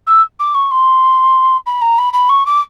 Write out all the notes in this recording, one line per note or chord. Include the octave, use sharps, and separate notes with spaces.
E6
D6
C#6
C6
B5
A#5
B5
B5
C#6
D6